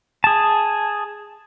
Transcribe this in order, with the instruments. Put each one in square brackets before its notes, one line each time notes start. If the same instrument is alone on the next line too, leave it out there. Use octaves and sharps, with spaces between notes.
[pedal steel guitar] G#4 A5